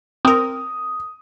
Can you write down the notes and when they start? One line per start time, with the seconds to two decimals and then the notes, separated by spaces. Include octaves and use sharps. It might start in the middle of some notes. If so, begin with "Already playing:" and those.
0.25 C4 A#4 D#6